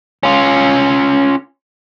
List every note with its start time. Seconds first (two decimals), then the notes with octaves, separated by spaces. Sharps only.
0.23 C#4 F4